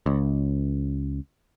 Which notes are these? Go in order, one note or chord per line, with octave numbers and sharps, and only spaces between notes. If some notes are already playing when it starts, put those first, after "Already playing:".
C#2